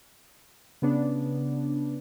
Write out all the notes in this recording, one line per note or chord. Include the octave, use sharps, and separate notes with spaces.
C#3 B3 D4